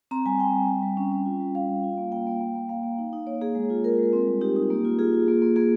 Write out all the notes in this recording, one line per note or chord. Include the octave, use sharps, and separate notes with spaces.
C4 A#5
G3 G#5
C4 G5
G3
G3
G3
C#4
C#4
F4
G3
G3 F5
G3
F4
A#3
A#3 G5
A#3
A#3
A#3
A#3 F5
A#3
D#4
D#4
A#3 C#5
A#3 G#4
G#3
F4
F4 A#4
G#3
C4
G3
D#4 G4
D#4
A#3
F4
F4 G#4
F4
A#3
A#3
A#3 G#4